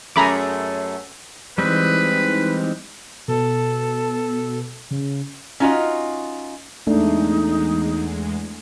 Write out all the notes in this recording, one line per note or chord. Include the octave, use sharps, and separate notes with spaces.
F#2 A3 G#4 A#5 B5 D6
E3 G3 G#3 C4 D#4 B4
B2 A4
C#3
C#4 D#4 F4 F#4 D#5
E2 G#3 A3 D4 D#4